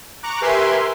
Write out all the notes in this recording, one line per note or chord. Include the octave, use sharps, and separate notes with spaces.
A#5 C#6 D6 F#6
G4 A#4 B4 E5 G#5 C6